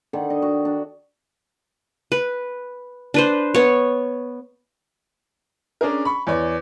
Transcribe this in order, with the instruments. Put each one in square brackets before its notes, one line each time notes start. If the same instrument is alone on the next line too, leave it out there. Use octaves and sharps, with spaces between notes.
[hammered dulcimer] D3 D#3
D#5
F#4
D4
[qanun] B4
D4 B4 C5
B3 C#5
[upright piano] C#4 D4 G#4 A#4
B5 C#6
E2 C#5 D5